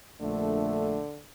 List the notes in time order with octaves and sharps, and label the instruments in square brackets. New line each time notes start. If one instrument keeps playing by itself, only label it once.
[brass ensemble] A#1 A3 [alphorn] D3